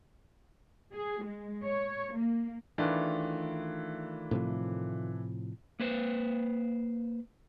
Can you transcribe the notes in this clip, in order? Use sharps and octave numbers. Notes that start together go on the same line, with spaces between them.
G#4
G#3
C#5
A#3
D#3 E3 A3 D4 F4
A2 C3 F3
A#3 B4 C5